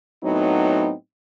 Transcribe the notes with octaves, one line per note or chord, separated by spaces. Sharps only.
A2 F#3 B3 C4 D#4